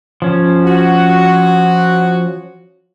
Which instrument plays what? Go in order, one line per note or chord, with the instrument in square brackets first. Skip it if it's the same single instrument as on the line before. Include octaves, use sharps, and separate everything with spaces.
[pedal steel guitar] F3 C#4
[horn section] F#4